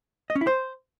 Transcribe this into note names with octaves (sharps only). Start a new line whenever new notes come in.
D#5
C#4
E4
C5